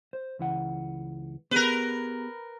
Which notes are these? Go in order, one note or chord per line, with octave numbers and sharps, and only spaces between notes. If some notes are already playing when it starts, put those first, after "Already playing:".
C5
C#2 E3 F#5
B3 G4 G#4 A#4 B4